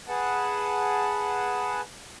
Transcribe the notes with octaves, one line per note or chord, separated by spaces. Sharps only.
G#4 B4 F#5 A5